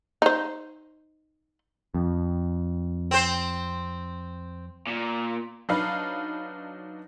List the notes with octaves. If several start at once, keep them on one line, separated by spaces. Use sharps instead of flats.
D#4 C5
F2
C4 C5
A#2
F#3 D4 D#4 B4 F5